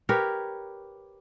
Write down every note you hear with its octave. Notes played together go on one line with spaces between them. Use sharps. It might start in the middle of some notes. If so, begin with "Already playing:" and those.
G4 A#4 B4 C#5